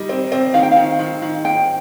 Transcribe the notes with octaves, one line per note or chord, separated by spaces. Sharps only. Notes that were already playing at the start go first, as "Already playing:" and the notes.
Already playing: D#3 G3 D#4
C4
C4
D#3 F5
G5
D#3 F5
D#3
D#3
D#3 G5